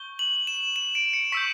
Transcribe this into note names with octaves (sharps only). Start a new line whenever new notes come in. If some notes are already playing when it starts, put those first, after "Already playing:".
Already playing: C#6 G6 G7
F#7
E7
E7
D7
C#7
C#6 E6 G6 B6